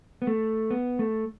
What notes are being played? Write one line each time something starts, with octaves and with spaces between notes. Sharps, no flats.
B3
A3
B3
A3